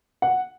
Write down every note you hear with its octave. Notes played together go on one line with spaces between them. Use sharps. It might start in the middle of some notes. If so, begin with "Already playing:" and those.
F#5